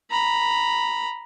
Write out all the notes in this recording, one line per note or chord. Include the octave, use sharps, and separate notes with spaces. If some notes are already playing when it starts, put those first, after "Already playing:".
A#5 B5